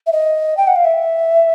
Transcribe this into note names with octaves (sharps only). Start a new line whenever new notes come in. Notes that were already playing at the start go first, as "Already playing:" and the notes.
E5
D#5
G5
F#5
F5
E5